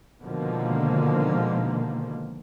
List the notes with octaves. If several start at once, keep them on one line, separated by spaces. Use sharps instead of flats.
B2 D3 D#3 F3 G#3 A#3